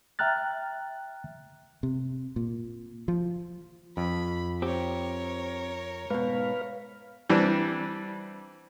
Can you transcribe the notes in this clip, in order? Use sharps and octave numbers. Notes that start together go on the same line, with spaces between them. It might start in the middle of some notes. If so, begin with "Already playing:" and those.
E5 G5 A#5 F6 F#6 A6
C3
A#2
F3
F2 B5
C4 G4 A#4 C#5
G#2 B2 B4 F5
E3 G3 C4 D4